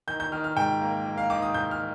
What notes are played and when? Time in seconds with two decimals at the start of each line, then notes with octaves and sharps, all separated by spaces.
0.07 D#3 G6
0.20 G6
0.32 D#3 F6
0.44 F6
0.57 G#2 G5
0.81 A#3
1.06 A#3
1.18 F5
1.30 D#3 D6
1.42 D#6
1.54 G#2 G6
1.71 F6